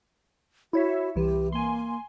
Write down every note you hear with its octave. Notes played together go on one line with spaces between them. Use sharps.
E4 F#4 C#5 E5
C2 E3 G4
A#3 G#5 C6